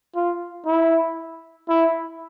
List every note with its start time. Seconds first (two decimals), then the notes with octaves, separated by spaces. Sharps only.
0.16 F4
0.66 E4
1.69 E4